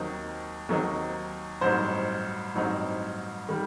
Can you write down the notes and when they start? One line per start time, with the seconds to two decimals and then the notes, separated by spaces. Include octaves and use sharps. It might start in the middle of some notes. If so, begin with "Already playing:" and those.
Already playing: D#2 D#3 F#3 C4 D#4
0.69 D#2 D#3 F#3 C4 D#4
1.61 A1 G2 F#3 C4 D#4 C5
2.55 A1 G2 F#3 C4 D#4
3.49 D#3 G3